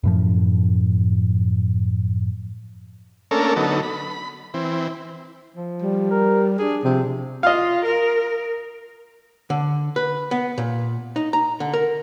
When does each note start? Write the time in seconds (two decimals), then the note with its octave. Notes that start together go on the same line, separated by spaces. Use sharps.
0.03 F#2 A2 F3
3.31 A3 A#3 C#4 D4 A4 A#4
3.56 D3 F#3 B3 D#4 A4
3.83 B5
4.54 E3 C4
5.55 F3
5.82 G3
6.11 A#4
6.58 D4 G#4
6.84 C3 F3
7.43 F4 D#5 F5
7.85 A#4
9.50 D3
9.96 B4
10.31 B3
10.58 A#2
11.16 D#4
11.33 A#5
11.60 D3
11.74 A#4